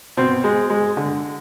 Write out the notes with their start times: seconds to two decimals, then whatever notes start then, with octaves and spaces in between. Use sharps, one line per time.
0.17 B2 C4
0.44 G#3
0.70 G#3
0.97 D3